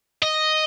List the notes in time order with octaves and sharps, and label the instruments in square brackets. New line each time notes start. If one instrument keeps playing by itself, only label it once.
[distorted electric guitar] D#5